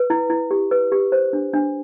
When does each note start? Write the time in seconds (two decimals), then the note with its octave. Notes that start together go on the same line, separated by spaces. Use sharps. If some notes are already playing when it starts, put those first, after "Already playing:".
Already playing: B4
0.10 E4
0.30 E4
0.51 G4
0.71 B4
0.92 G4
1.12 C5
1.33 D4
1.54 D4